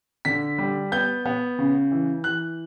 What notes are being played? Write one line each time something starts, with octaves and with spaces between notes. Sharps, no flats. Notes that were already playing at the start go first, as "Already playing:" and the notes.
D3 B6
G3
B3 G6
B3
C#3
E3
E3 F#6